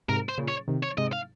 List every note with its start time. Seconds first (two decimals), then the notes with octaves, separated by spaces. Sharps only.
0.08 G#2 C3 A#4
0.29 C5
0.38 A#2 C#3
0.48 C#5
0.68 C3 D#3
0.83 C#5
0.98 G#2 C3 D#5
1.13 F5